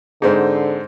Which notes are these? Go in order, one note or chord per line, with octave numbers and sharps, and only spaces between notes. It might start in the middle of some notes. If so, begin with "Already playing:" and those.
G#2 D3 C4 D#4 G#4